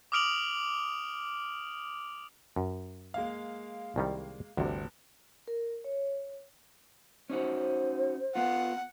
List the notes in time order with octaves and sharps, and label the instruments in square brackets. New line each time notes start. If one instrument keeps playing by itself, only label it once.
[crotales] D6 D#6 F6 D7 F7 F#7
[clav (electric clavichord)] F#2
[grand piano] G#3 A#3 F5
[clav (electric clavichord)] C2 D#3 G3
[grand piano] G1 [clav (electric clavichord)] D2 C3
[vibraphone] A#4
C#5
[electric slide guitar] C#4 D#4 F#4 [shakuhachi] C5
[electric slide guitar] B3 F4 [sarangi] F#5